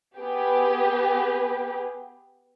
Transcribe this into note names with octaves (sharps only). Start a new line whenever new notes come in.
B3 G4 G#4 B4